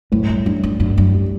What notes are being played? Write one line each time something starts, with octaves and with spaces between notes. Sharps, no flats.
F#2 A2
G2
F#2 D4
F#2
F#2 D4
F#2
G3